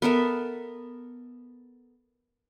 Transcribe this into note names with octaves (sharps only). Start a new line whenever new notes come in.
B3 A4 A#4 E5